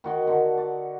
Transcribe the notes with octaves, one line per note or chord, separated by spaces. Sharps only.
D#3 F#4 D#5
D3
D5